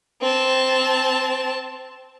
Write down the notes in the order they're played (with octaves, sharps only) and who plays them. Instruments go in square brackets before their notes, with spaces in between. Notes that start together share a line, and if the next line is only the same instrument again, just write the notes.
[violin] C4 A5